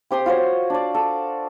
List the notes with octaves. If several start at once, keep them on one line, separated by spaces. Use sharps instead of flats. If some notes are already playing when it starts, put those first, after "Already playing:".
C4 G4 C6 D#6
F4 F#4 C5 C#5
D4 D5
A4